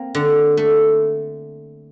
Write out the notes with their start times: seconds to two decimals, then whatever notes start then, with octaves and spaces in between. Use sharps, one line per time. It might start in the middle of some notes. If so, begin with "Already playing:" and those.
Already playing: A#3 C4
0.15 D3
0.57 A3